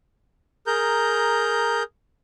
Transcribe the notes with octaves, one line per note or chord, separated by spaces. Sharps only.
G#4 A#4 A#5 G6